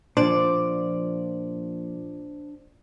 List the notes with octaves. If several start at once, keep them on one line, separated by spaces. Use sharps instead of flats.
A#2 F3 D4 C5 D5